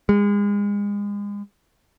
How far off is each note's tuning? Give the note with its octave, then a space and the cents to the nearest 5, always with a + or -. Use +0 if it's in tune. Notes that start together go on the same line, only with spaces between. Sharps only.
G#3 -35